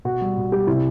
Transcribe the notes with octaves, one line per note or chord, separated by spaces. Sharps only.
B2 F#4
G3
B2
G3 G4
C3 E4